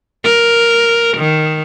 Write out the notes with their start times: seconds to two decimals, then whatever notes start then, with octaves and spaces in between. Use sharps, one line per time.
0.24 A#4
1.17 D#3